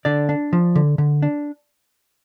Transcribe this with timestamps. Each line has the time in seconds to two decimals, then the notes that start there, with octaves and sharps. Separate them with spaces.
0.05 D3 D5
0.29 D4
0.53 F3
0.75 D3
0.98 D3
1.22 D4